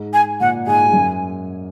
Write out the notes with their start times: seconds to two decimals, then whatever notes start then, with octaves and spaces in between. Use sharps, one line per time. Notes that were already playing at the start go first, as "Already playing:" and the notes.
Already playing: G#2
0.13 G#5
0.40 A#2 F#5
0.67 G#2 G#5
0.85 G#2
0.93 F#2